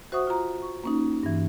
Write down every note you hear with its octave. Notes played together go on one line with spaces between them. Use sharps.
F#4 C5 E5 F#5 C#6 D#6
F4 A#5
C#6
A#3 C#4 D#4
G2 E3